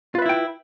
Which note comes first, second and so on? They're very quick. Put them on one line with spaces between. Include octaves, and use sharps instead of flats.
F4 B4 E5 E4 G5